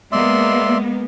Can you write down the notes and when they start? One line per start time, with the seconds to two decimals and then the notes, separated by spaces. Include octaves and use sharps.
0.12 G#3 A#3 B3 D5 E5 C6